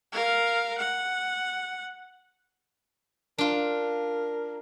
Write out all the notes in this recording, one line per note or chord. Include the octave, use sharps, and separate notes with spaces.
A#4 F5
F#5
D4 F4 A#4